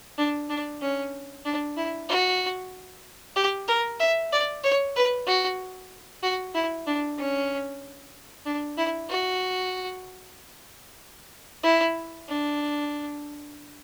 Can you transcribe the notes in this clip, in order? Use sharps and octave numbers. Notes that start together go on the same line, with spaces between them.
D4
D4
C#4
D4
E4
F#4
G4
A#4
E5
D5
C#5
B4
F#4
F#4
E4
D4
C#4
D4
E4
F#4
E4
D4